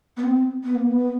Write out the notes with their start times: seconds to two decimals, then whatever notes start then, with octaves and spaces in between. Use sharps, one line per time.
0.17 B3
0.24 C4
0.64 B3
0.75 A#3
0.87 B3